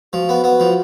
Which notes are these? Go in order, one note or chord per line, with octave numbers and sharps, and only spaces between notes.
F3 F#4
B3
B3
F3